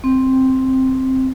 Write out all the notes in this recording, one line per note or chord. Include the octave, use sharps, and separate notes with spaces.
C4